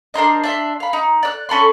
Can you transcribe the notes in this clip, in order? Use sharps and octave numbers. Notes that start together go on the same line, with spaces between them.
D4 A#4 C5 D#5
D4 E5 C6
F5 B5
D#4
D5 E6 F#6
C#4 A4 B5 C6